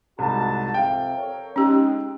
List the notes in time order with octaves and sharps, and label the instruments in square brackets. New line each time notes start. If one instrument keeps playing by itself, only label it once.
[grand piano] C2 G#2 [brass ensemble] F#4 A5
[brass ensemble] F2 C3 [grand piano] F5 G5
[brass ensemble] A4 A#4 C#5
[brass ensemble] G#3 C4 D#4 [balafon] C#4 G4